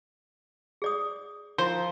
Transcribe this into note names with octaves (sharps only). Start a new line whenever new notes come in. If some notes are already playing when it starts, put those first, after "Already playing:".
G#4 D5 D#6
F3 E4 A#4 C5